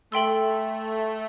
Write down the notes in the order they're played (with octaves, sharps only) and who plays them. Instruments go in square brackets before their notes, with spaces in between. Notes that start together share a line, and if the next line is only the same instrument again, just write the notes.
[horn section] A3 [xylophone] A4 E5 G5 C6 E6